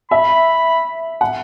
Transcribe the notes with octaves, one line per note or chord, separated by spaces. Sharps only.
E5 B5
F#5